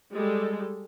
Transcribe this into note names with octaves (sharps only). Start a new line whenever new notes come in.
G3 G#3 A4